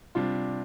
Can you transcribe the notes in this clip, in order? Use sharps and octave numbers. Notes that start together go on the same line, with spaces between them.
C3 G3 D4 F4